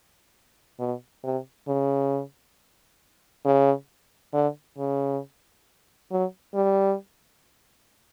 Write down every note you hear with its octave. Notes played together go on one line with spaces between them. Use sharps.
B2
C3
C#3
C#3
D3
C#3
F#3
G3